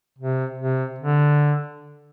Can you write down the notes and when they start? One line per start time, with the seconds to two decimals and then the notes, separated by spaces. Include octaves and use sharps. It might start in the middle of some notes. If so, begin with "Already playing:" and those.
0.19 C3
0.58 C3
0.99 D3